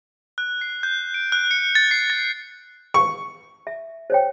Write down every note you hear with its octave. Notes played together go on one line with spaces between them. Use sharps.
F#6
C7
G6
D7
F#6
C#7
A6
C7
A6
C#6
E5
C5 C#5 G5